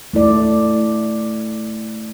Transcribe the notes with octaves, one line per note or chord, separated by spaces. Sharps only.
A3 E4 D5